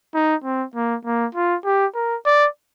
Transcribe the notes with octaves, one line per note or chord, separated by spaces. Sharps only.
D#4
C4
A#3
A#3
F4
G4
A#4
D5